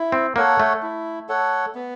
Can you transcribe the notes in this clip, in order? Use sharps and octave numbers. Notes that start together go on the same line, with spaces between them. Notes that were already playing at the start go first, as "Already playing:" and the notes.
Already playing: E4
C4
A#3 A4 C#5 F#5
A3
E4
A4 C#5 F#5
B3